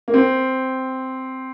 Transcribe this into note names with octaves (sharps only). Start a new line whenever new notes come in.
A#3
C4